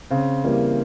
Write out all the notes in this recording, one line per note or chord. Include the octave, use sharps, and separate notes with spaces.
C#3 C4
E3 G3 A#3